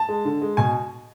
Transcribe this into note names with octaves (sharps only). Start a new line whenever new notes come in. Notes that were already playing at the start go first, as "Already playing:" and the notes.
Already playing: A5
G#3
D3
G#3
B2 G#5